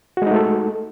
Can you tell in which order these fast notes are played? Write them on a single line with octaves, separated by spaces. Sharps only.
F#4 G#3 D#4 A3 A4